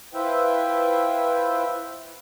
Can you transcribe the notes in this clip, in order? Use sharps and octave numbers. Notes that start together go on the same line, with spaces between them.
E4 F4 B4 C5 E5 G5